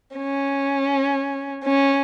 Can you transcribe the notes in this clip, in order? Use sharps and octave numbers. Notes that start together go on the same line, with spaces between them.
C#4
C#4